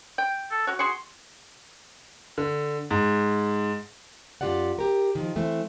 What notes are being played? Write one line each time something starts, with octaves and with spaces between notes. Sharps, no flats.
G5
A4
F#4 C#5 F#5
F#4 G#4 C6 C#6
D3
G#2
F#2 D3 F4 G4 D5 F#5
G4 A#4
D#3 F3
E3 A3 C4